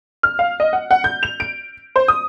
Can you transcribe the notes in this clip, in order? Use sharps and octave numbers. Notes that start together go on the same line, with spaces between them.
F6
F5
D#5
F#5
F#5
G6
F7
D7
C5
D#6